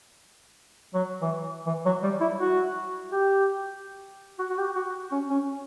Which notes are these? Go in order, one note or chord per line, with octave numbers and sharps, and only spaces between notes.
F#3
E3
E3
F#3
G3
E4
F#4
G4
F#4
F#4
G4
F#4
C#4
C#4